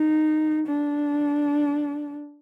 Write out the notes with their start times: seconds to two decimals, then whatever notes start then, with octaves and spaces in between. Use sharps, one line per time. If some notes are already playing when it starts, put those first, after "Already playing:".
Already playing: D#4
0.67 D4